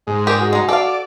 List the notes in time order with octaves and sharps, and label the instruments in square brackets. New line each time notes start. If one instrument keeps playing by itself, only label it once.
[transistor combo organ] G#2 [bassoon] G#3
[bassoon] A#2 [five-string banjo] G#3 G4 G#4
[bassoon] F#4
[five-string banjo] G#3 D#4
[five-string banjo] A4 F5 [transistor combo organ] D5